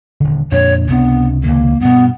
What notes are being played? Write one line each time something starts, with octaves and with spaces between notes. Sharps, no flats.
D#1 D3
F2 A#2 D4 C#5
C#2 C3 B3 D4
C#2 C3 D#3 A#3
G2 B2 B3